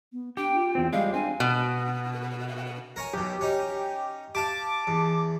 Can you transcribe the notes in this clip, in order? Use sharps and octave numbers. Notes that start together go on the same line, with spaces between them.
B3
D4 G4 G5
F4
E2 C4
G3 G#3 D5 F5
C4 D4 G#5
B2
A#4 C#5 G#5
B1 B2 G4
C#4 D#4
G4 F5 A5 D6
E2